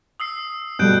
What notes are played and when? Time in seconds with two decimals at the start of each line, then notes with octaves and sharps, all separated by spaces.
0.20 D#6 E6 C7
0.79 B2 G3 A3 F#6 G6 D7